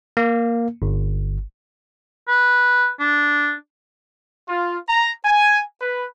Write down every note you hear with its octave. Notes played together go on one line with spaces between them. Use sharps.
A#3
G1
B4
D4
F4
A#5
G#5
B4